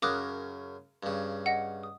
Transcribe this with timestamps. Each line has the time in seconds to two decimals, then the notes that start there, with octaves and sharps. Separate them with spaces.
0.02 F#2 C#3 A#4 D6 D#6 F#6
1.03 G2 C#3
1.46 D#5 F#5
1.83 D#6